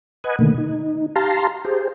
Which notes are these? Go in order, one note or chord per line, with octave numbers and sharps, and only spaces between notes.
B4 D#5 F#5 G#5
B2 D3 D#3 A3 A#3
D#4
G4 F5 A5 A#5 C6
G4 G#4 C5